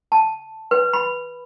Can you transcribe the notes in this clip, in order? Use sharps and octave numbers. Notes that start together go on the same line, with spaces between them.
A5
B4
B5